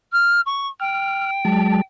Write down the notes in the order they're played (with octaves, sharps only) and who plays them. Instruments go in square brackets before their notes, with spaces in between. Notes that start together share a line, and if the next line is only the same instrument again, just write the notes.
[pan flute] F6
C#6
[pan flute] G5 [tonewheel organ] F6
[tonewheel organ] F#3 G#3 A5